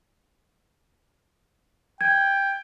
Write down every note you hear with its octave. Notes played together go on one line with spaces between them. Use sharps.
G5 G#6